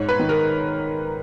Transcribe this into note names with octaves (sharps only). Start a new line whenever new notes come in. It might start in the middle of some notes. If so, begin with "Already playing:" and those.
Already playing: G#2 C#5
B4
D#3
A#4